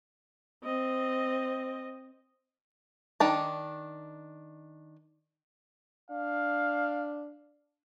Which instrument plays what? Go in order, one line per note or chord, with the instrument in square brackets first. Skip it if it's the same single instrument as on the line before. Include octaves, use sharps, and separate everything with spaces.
[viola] C4 D#5
[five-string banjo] D#3 D4 A5
[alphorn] D4 [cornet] F5